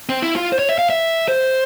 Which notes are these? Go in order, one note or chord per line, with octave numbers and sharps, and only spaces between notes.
C4
E4
F4
C5
C#5
E5
F5
E5
C5